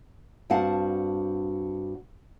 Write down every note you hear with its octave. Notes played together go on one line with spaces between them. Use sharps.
G2 C4 F#4 F5 F#5 A5